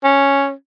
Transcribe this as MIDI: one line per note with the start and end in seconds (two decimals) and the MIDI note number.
0.04 0.51 61